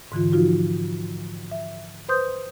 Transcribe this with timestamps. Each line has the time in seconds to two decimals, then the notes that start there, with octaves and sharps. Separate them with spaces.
0.12 G#2 D3 E3 F4
0.32 F3 D#4 F4 F#4
1.51 E5
2.08 B4 C5 C6 D#6 G6